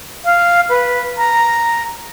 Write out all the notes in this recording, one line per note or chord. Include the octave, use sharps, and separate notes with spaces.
F5
B4
A#5